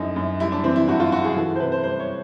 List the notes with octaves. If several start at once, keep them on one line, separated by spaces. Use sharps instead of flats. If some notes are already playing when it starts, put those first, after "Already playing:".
Already playing: F#2 D3 G3 D#4 E4
F#2
G3 E4
D4
E3 C4
E4
G2 F#4
F4
G2 F#4
G#4
E3 A4
C5
C3 B4
C5
G3 C5
C#5